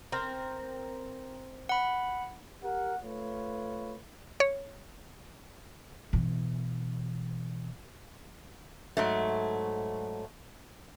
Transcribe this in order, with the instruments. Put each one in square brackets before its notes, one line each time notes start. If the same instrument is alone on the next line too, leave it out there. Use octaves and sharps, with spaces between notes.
[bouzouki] C4 A#4
[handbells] F#5 B5
[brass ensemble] G4 A#4 F#5
A3 F4 B4 C#5
[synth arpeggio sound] C#5
[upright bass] B2 E3
[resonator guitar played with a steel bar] G#2 F#3 A3